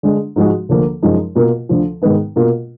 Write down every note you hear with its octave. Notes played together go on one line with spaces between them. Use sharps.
D3 G#3 D4
G#2 F3 G#3 D#4 F#4
D2 D3 F3 A#3
F#2 F3 G#3 D#4
B2 A#3 F4 A#4
D2 D3 F3
G#2 D#3 G#3 B3 D#4
B2 A#3 F4 A#4